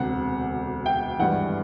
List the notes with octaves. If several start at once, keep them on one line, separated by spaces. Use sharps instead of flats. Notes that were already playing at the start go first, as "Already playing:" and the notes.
Already playing: E1 D2 C3 F#5
G5
G#1 G2 E3 F#5